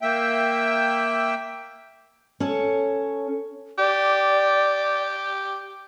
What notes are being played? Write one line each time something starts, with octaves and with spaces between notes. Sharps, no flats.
A#3 E5 G5
C#4 A4 C#5
G4 D5